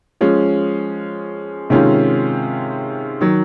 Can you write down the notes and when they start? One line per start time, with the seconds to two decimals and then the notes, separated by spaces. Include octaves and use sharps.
0.21 F3 G#3 C#4
1.70 C3 D#3 G#3 C#4 F4
3.21 D#3 F#3